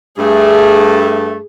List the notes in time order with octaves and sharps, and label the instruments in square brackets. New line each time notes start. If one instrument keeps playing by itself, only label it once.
[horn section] G2 A3 [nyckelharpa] G#4